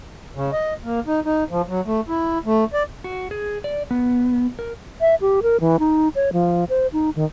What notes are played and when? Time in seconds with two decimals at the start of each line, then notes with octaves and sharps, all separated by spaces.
0.36 C#3
0.52 D#5
0.84 A#3
1.07 D#4
1.25 D#4
1.50 F3
1.68 F#3
1.86 A3
2.08 E4
2.46 A3
2.73 D5
3.04 F#4
3.31 G#4
3.64 D5
3.91 B3
4.59 A#4
5.01 E5
5.21 G4
5.43 A#4
5.60 E3
5.79 D#4
6.15 C#5
6.33 F3
6.69 C5
6.93 D#4
7.16 D#3